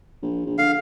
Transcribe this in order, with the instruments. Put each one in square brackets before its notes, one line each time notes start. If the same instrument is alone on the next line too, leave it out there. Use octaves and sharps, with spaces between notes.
[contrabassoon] A#1
A#1
[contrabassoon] D3 [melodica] F5